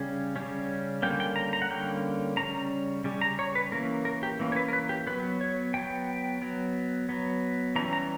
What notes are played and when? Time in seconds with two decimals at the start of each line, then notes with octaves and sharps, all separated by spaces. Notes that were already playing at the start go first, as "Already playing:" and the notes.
Already playing: C#3 G3 C#4
0.36 C#3 G3 C#4
1.02 D3 G3 A#3 C#4 G5
1.20 G5
1.36 A#5
1.53 A#5
1.62 F#5
1.70 D3 G3 A#3 C#4 G5
2.37 C#3 G3 A#3 C#4 A#5
3.04 C#3 G3
3.21 A#5
3.39 C#5
3.55 B4
3.72 E3 A#3 C#4 A#4
4.05 A#4
4.23 G4
4.39 E3 A#3 C#4
4.52 C#5
4.56 B4
4.68 A#4
4.73 B4
4.89 G4
5.07 F#3 B3 B4
5.41 C#5
5.74 F#3 B3 G5
6.42 F#3 B3
7.09 F#3 B3
7.76 E3 G3 C#4 A#5
7.93 A#5